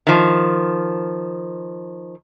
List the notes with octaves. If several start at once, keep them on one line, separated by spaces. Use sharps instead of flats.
D#3 F3